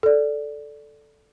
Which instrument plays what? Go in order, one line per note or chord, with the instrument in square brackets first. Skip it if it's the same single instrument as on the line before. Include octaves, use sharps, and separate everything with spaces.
[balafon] A4 D5